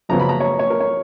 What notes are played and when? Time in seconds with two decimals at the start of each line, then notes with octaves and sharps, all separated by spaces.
0.09 F#2 C#3 F3 B3 A#5
0.19 B5
0.29 A#5
0.40 C#5
0.59 C#5
0.70 A#4
0.80 C#5